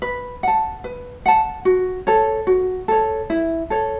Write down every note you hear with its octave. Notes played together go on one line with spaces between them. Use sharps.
B4
F#5 A5
B4
F#5 A5
F#4
A4 C#5
F#4
A4 C#5
E4
A4 C#5